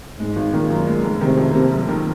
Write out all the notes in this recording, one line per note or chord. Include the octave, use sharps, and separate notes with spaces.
G#2 G#3
G#1
A#2 D#3
F#2
G#3
F1
C3 D#3
F2
C3 A#3
F#1
D#3